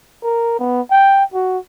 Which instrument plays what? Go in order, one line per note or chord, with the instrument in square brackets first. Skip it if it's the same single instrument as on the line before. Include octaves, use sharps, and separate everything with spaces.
[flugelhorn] A#4
B3
G5
F#4